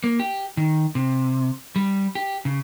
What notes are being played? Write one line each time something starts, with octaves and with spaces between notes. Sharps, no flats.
A#3
G4
D#3
C3
G3
G4
C#3